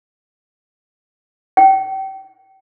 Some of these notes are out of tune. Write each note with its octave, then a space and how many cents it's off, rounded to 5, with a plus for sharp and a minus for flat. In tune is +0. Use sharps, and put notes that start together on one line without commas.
G5 -30